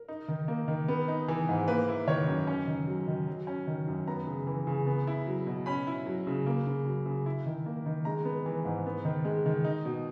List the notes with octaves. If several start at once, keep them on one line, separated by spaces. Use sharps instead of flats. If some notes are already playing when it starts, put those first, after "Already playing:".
Already playing: A#4
D#4
D#3
A#3
D#3
B3
D#4
E3
G#2
A#3 B4
E4
D#3 C#5
F#2
C#4
D#3
F#3
D#3
F#3
C#4
D#3
F#2
B3 A#5
C#3
E3
C#3
B3
E4
F#3
B2
C#4 B5
E4
F#3
C#3
A#3
C#3
F#3
C#3
E4
D#3
A#3
D#3
G#3 A#5
B3
E3
G#2
B3
D#3
G#3
D#3
D#4
B2